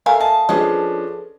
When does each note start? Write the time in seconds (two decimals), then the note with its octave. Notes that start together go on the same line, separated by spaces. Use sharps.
0.06 A3 A#4 E5 F5 G#5
0.20 D#5 A5
0.49 F3 C#4 D4 G#4 A4 B4 D#5